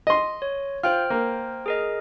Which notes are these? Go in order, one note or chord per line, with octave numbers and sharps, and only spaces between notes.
D#5 C6
C#5
F4 C5 G5 F6
A#3
G#4 A#4 D#5